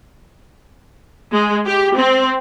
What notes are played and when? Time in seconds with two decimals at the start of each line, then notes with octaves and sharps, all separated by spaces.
1.32 G#3
1.65 G4
1.95 C4